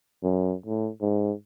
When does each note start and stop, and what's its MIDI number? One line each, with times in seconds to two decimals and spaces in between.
0.24 0.54 42
0.66 0.90 45
1.01 1.32 44